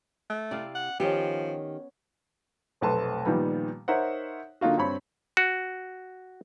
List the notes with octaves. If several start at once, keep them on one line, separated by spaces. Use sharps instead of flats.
A3
C3 E4 D5 F5
F#5
D#3 F3 B3 C#4 G4
F1 B1 A3 B4 A5 C6
A#2 D#3 F3 G3 B3
D#4 A#4 C5 C#5 E5 F#5
D3 A#3 D#4 F4 F#4
G2 C4 C#5 B5
F#4